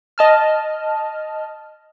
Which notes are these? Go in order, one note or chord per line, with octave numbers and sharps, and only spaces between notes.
D#5 A5 F6